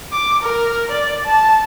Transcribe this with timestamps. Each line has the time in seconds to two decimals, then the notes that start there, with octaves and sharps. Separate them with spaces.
0.12 D6
0.42 A#4
0.91 D5
1.25 A5